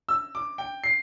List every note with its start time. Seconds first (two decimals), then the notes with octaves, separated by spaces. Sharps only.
0.09 E6
0.35 D6
0.58 G5
0.84 C7